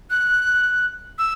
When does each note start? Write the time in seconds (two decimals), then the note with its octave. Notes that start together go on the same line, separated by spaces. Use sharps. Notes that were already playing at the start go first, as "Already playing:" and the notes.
0.10 F#6
1.18 E6